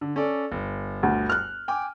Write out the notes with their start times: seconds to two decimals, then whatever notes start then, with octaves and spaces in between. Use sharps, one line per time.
0.01 D3
0.16 C#4 A4 D5
0.51 G1
1.03 D2
1.30 F6 F#6
1.68 G5 G#5 D6